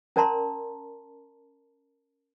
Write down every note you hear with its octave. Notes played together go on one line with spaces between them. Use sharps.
C#4 A#4 D5 A5 A#5 C6